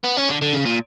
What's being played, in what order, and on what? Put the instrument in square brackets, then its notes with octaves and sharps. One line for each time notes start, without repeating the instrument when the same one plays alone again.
[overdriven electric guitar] B3
C#4
D3
D3
C#3
A#2